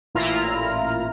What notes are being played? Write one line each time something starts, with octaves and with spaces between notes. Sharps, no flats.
A1 A#2 E4 F4 A#5 F6